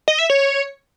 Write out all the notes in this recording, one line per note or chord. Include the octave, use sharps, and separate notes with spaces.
D#5
E5
C#5